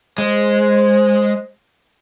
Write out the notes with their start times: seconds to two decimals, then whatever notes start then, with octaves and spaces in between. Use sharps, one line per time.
0.18 G#3 C5